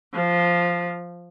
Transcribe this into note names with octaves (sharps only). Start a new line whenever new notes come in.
F3